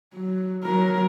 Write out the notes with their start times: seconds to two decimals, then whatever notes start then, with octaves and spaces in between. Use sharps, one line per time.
0.14 F#3
0.64 F#3 A#4